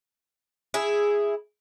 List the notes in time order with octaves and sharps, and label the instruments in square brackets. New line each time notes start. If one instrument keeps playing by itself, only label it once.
[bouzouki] E4 G#4